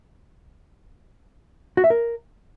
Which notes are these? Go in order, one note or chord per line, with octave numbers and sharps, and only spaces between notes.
F#4
E5
A#4